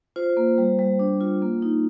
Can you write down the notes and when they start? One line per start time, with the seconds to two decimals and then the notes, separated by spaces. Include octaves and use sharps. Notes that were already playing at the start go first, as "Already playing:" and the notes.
0.16 F4 C5
0.37 A#3
0.58 G3
0.79 G3
0.99 D4
1.21 F4
1.42 A#3
1.62 D#4